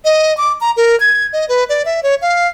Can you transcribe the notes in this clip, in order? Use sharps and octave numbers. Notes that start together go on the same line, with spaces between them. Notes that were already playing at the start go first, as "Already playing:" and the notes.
D#5
D6
A#5
A#4
G#6
D#5
B4
D5
E5
C#5
F5